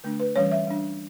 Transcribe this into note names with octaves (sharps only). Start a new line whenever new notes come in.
D3 A3 D4
B4
E3 G3 C#4 C#5
E5
G3 D4